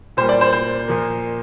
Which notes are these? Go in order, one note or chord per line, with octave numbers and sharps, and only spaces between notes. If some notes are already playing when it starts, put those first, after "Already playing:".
A#2 G3 A#3 C5
D5
C5
C5
A#2 F3 A#3